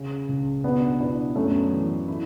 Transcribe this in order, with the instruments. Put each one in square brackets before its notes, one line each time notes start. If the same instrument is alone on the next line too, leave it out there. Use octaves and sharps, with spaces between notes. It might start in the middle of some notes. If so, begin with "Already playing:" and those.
Already playing: [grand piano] C#3
C#2
[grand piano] B2 [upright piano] B3 D4
[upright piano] B3 D4 [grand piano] E4
[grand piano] F#2 [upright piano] A3 C#4
[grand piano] E3
E4